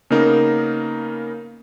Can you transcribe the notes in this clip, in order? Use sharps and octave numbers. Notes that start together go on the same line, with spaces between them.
C#3 A#3 B3 D#4 A#4